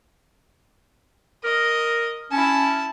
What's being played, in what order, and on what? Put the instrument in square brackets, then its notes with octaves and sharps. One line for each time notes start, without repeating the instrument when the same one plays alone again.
[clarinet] A#4 [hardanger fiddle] D#5
[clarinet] C#4 [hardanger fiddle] E4 A5